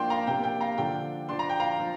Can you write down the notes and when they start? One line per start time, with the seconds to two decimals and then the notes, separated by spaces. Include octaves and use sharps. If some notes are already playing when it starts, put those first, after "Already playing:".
Already playing: F3 A#3 D4 G5 C6
0.10 F5 A#5
0.27 C3 A#3 D4 G5
0.44 G5
0.61 F5 A#5
0.78 D3 F3 D4 G5
1.29 F3 D4 C6
1.39 A#5
1.49 G5
1.60 F5 A#5
1.80 F3 D4